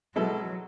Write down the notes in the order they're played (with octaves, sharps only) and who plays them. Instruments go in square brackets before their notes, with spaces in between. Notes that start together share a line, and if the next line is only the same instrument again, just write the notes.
[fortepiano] B2 G#3 B3 E4 A4 [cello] F#3